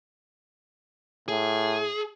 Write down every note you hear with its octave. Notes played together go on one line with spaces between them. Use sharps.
A2 G#4